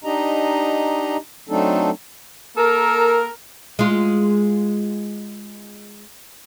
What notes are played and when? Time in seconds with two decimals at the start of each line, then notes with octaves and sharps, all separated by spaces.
0.04 D4 D#4 G4 D#5 A#5
1.49 F#3 A3 C4 D4 D#4 A4
2.57 A#3 A4 A#4
3.79 G#3 F4